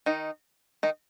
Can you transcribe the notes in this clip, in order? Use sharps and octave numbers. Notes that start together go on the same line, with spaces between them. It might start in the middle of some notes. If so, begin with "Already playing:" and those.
D#3 D#4
D#3 D#4